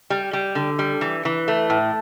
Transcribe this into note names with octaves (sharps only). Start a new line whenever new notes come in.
G3
G3
D3
G3
E3
E3
A3
A2